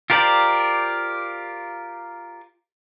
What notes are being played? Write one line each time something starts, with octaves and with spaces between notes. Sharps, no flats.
F4 G4 A#4 C5 D5